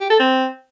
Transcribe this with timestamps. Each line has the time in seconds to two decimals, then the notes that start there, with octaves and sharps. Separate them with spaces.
0.01 G4
0.10 A4
0.19 C4